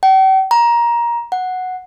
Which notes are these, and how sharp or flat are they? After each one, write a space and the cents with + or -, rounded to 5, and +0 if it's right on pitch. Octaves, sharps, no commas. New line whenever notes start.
G5 -45
A#5 +20
F#5 -5